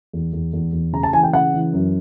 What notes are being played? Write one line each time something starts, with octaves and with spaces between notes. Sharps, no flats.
E2
E2
E2
E2
C#3 A#5
A5
E3 G#5
G5
C#3 F#5
E3
F#2